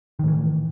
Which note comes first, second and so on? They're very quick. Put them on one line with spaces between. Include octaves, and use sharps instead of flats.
D#3 A2 E3